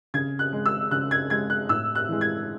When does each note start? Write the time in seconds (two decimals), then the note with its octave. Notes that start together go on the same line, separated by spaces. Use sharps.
0.14 C#3 G#6
0.39 F#6
0.53 G#3
0.66 E6
0.91 C#3 F#6
1.11 G#6
1.30 G#3 G#6
1.50 F#6
1.69 A2 E6
1.95 F#6
2.09 E3 G#3
2.21 G#6